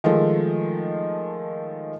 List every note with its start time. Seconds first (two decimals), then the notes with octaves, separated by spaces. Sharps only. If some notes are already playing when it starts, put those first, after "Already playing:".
0.04 D#3 F3 G#3 A3